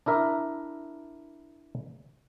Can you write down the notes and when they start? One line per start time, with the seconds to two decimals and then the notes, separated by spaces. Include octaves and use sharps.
0.06 D4 E4 A#4 E5